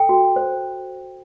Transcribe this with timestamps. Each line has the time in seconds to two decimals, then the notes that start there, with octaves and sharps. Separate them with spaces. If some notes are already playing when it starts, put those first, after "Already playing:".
Already playing: A4 G5
0.09 F#4
0.36 C5